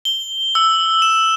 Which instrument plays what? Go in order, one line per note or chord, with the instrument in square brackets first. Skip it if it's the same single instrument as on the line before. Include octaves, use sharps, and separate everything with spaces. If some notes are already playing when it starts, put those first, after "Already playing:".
[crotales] G7
E6
E7